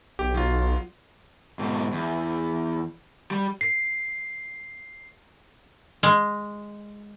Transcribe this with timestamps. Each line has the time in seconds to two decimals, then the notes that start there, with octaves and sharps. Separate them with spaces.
0.19 B1 G4
0.34 F#3 F4
1.59 G#2 B2
1.92 E2
3.31 G3
3.61 C7
6.03 G#3